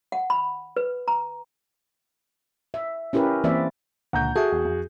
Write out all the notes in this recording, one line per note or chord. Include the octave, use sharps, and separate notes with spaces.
F#5
B5
B4
A#5
E5
C#4 E4 G4 A#4 B4
E3 A#3 C4 B4 D5 E5
C#2 A#2 D3 F#5 A#5 G6
F#4 G#4 A4 E5
E2
F2